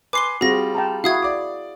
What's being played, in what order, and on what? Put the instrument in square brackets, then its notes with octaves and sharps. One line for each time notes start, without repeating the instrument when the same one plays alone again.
[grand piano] B4 G#5 C6 [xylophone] D6 C7 G7
[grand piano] G3 F4 [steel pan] C4 F#4 [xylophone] G#4 A#6
[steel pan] G5 A5 A#5
[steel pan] E4 F#4 [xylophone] F5 D#6 G#6
[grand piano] D5 D6